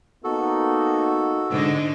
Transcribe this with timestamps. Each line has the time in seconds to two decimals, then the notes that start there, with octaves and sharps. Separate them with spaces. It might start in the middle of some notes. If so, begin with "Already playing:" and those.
0.24 A#3 B3 D#4 F#4 A4
1.49 G#2 D3 D#4